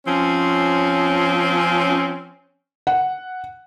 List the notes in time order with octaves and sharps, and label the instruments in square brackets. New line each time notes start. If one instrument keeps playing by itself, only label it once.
[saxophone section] F3 C4 C#4
[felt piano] F#5